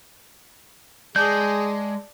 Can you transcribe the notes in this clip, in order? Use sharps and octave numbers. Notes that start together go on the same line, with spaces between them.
G#3 G#4 D5 A5 D6 G6